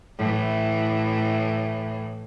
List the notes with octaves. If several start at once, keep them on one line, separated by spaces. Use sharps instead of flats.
A2 E3